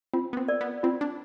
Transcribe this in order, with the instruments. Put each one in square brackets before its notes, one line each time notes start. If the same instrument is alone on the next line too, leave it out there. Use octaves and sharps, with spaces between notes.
[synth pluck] C4 [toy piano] F4
[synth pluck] B3
C4
[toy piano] A#4 D5
[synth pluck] B3
[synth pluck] C4 [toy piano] F4
[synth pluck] D4